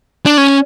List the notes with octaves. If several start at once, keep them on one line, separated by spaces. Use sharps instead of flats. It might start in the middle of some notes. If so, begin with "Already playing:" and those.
D4
C#4